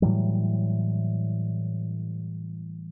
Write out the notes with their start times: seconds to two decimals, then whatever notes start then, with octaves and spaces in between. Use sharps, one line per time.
0.02 A2 E3 F#3 G3